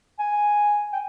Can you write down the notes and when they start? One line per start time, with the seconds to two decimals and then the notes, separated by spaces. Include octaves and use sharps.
0.19 G#5
0.93 G5